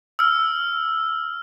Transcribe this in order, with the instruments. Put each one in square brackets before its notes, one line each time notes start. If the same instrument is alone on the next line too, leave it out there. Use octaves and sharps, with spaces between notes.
[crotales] E6 F6